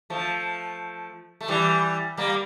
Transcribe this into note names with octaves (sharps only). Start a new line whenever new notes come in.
F3 A3
A3
E3 G3
G3 A#3